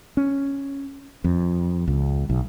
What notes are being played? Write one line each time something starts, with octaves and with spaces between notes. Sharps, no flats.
C#4
F2
C#2
B1